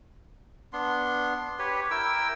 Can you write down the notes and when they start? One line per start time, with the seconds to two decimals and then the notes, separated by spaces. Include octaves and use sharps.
0.73 B3 D4 C6
1.59 G4 B4 C#5
1.91 E4 A#4 G5 E6